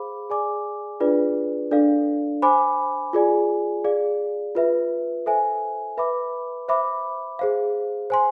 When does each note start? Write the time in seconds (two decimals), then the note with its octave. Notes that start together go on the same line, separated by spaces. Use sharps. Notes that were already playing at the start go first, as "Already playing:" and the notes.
Already playing: G#4 C5 F5 B5 D6
0.30 G#4 D5 G#5 D6
1.00 D4 F4 G#4 B4 D5
1.71 D4 A4 D5 F5
2.42 C5 G#5 B5 D6
3.13 F4 G#4 D5 G#5
3.85 G#4 D5 F5
4.55 F4 B4 E5
5.26 A4 C5 E5 G#5
5.97 B4 E5 B5 D6
6.68 C5 E5 B5 D6
7.39 G#4 C5 F5
8.10 C5 G#5 C6